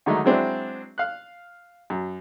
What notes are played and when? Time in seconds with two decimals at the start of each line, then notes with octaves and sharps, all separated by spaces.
0.06 D3 D#3 F#3 G#3 A3 D#4
0.24 F#3 G#3 C4 D4 E4
0.98 F5 F#6
1.90 F#2